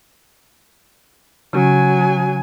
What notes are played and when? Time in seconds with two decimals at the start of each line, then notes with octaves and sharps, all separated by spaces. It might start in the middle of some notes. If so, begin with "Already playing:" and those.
1.53 C#3 F#3 C#4 G#5